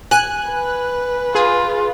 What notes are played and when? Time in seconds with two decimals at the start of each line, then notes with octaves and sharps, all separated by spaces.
0.11 G#5 F#6
0.50 B4
1.35 F4 G#4